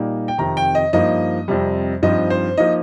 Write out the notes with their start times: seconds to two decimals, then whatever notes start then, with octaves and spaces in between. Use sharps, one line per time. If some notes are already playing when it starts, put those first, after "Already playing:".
Already playing: A#2 G3 A#3 D#4
0.28 G5
0.38 F2 C3 D#3 A#5
0.57 G5
0.75 D#5
0.93 G2 F3 A#3 D#4 D#5
1.48 F2 C3 G3
2.03 G2 F3 C4 D#4 D#5
2.30 C5
2.58 F3 A#3 D#4 D#5